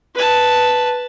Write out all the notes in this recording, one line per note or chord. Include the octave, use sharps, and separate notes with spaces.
B4 A5